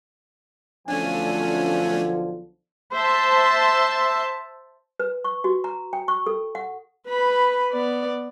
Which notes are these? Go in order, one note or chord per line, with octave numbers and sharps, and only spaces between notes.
B1 D3 F3 A3 C#4 D4 G#5
C5 E5 A5
B4
C#6
F#4
A#5
G5
C#6
A4
F#5
B4 B5
B3 D5